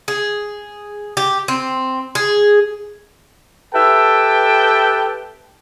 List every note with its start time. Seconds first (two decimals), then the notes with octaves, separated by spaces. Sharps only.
0.08 G#4
1.17 G4
1.48 C4
2.15 G#4
3.74 G4 A4 B4 E5 G5 A5